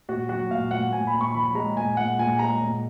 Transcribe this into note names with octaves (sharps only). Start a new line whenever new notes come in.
A#2 F#4
F#3 F#4
A#2 F5
A#2 F#5
A#2 G#5
B5
A#2
C#6
F3 B5
G#3 A#5
A#2 G#5
A#2 F#5
A#2 G#5
G#3 A#5
A#2